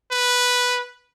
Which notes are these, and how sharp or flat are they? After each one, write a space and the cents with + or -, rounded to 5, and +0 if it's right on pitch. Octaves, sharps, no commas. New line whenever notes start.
B4 -5